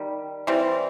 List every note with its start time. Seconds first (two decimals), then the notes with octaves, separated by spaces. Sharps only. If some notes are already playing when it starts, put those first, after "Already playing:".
Already playing: D#3 G3
0.47 E3 G3 C4